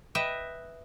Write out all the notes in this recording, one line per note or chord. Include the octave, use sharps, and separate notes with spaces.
B4 D#5 E5 G5